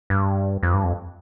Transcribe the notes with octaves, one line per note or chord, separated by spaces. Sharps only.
G2
F2
G2
F2